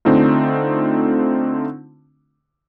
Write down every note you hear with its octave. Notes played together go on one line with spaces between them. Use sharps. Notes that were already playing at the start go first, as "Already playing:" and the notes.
D3 A3 C4 D4 D#4 F4